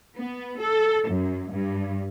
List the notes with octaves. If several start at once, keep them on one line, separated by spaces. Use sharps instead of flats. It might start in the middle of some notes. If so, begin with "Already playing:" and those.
B3
A4
F#2
G2